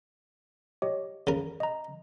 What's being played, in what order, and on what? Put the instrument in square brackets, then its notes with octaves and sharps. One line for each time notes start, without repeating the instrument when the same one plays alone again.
[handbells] G4 C#5 D#5
[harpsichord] C#3 A#4
[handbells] D#5 A#5